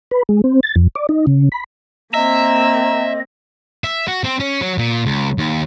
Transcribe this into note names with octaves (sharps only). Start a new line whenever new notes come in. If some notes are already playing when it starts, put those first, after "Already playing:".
B4
G#3
C4
A6
F2
D5
D#4
C#3
B5
A#3 C4 D#5 E5 A#5
E5
F#4
C4
C#4
F#3
A#2
C#2
D#2